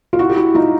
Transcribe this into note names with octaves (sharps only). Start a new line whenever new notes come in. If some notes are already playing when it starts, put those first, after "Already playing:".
F4
E4 F#4
G4
E4 F#4
D#4 F4